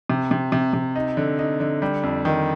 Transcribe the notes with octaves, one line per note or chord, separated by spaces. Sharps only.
C3
C3
C3
C3
D#4
D3
D#4
D3
G3
F2
D#3